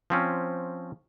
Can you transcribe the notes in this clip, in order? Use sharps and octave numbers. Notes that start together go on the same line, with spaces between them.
F3 C4 C#4